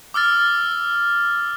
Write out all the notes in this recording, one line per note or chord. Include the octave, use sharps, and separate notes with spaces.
D6 E6 F6 A6